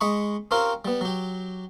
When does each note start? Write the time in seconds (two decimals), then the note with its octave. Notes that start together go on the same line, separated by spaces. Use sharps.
0.01 G#3 D#5 B5 C#6
0.51 C4 C#4 F4 G4 A#4 C5
0.85 G3 B3
1.01 F#3 G4